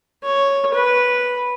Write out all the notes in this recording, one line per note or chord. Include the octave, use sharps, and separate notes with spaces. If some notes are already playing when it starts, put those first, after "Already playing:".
C#5
B4